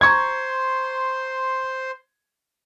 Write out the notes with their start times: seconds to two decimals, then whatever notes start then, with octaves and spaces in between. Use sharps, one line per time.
0.01 C5 A#5 C6 C#6 G#6